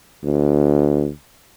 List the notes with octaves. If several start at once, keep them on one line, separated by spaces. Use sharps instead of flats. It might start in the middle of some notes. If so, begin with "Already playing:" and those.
D2